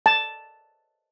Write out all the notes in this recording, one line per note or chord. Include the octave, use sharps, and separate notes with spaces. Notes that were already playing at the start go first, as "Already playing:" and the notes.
A5